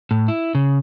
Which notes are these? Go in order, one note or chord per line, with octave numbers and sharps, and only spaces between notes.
A2
E4
C#3